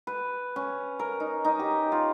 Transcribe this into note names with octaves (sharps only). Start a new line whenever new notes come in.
B4
C#4
A#4
D#4
D#4
G4
F4